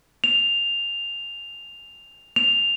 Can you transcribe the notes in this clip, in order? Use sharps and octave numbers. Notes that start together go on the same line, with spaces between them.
F7
F7